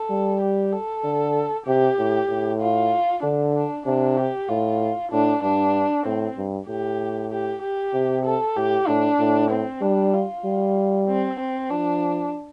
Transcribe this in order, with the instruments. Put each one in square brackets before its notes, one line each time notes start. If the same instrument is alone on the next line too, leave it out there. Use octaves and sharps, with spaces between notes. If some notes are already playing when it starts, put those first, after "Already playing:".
Already playing: [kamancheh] A4
[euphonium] G3
[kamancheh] G4
A4
[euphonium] D3
[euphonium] C3 [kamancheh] G4
[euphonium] A2
A2
[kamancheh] F4
[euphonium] D3 [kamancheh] D4
[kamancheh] D4
[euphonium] C3 [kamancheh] D4
[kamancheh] G4
[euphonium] A2 [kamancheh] F4
[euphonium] A2 [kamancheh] D4
[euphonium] G2 [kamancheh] D4
[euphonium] A2 [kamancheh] C4
[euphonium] G2
[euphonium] A2 [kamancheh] G4
[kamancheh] G4
G4
[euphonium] C3
[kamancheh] A4
[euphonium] A2 [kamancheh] G4
[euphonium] A2 [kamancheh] D4
[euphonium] A2
[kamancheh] C4
[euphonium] G3 [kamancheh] D4
[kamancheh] F4
[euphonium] G3
[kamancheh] C4
C4
[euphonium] F3 [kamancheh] D4